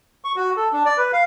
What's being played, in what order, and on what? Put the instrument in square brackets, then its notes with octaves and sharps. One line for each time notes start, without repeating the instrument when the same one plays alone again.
[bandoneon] C#6
F#4
A4
D4
D5
B4
F5